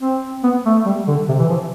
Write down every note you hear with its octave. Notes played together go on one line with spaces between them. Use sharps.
C4
B3
A3
G3
D3
C3
E3
F3